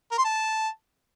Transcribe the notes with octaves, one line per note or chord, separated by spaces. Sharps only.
A#4
C6
A5